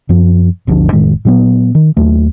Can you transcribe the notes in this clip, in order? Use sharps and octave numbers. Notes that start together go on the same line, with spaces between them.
F#2 F3
G1 D2 F3 D4
F1 A2 D#3 G#3
A#2 F#3 A3 B3
D#3
D#2 F#3 A3